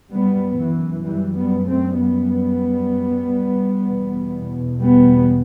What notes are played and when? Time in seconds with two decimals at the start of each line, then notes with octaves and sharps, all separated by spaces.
0.12 F#2 G3 B3
0.59 E3
1.06 E3 G3
1.37 G3 B3
1.68 A3 C4
1.99 G3 B3
3.86 E2 B2
4.81 G3 B3